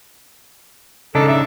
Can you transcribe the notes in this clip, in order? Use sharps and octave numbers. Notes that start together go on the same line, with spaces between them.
C#3 D4 D#4 A4
E5